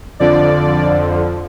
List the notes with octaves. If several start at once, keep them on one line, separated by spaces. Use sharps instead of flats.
F2 D3 F3 D5